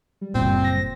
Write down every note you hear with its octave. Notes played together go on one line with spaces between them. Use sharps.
G3
F#1 A#2 C4
A#6